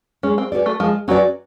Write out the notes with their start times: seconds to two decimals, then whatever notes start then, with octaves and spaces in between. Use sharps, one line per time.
0.23 G#3 C#4
0.38 C4
0.52 C#4 F#4 B4 D5
0.66 A3
0.80 F3 G#3
1.08 F#3 C#4 F#4 B4 D5